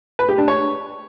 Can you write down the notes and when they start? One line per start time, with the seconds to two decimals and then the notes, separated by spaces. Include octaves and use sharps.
0.19 B4
0.29 G4
0.38 D4
0.48 C#5